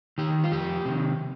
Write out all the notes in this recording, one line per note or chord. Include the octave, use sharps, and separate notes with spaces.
D#3 G4
F4
F2 G4
C3 D#3